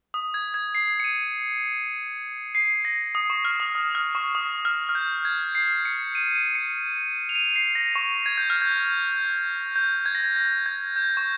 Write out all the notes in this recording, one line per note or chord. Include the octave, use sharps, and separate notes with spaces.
D#6
G#6
G#6
C7
C#7
D#7
C7
A#6
D#6
C#6
F6
D#6
D#6
F6
C#6
D#6
F6
F6
G6
G#6
C7
C#7
D#7
D#7
C#7
F7
D#7
C7
A#6
C#6
G#6
G6
F6
G6
G6
G#6
A#6
G#6
A#6
G#6
G6
C#6